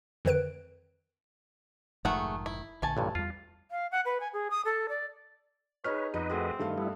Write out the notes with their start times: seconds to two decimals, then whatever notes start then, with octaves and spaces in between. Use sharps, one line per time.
0.25 F2 D3 D#3 B4 F#6 D7
2.05 F1 G#2 D#3 F3 A3 G#4 F#5
2.46 E4
2.82 A#1 D3 A3 G#5 A5
2.97 A1 G2 A#2
3.15 E2 G3 F4
3.71 F5
3.92 F#5
4.05 B4
4.20 G#5
4.33 G#4
4.51 D#6
4.65 A4
4.89 D5
5.84 D#4 G#4 B4 C#5 F6
6.14 F2 B3 D#4 B4 D#5
6.29 A3 C4 F#4 G#4
6.59 G2 D#3 A3 F5
6.78 G3 B3 E4